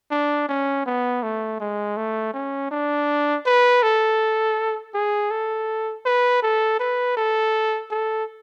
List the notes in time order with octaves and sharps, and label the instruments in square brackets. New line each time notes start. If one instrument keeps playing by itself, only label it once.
[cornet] D4
C#4
B3
A3
G#3
A3
C#4
D4
B4
A4
G#4
A4
B4
A4
B4
A4
A4